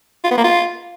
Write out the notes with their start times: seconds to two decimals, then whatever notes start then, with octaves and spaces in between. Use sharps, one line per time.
0.24 F4
0.31 B3
0.38 A#3
0.44 F4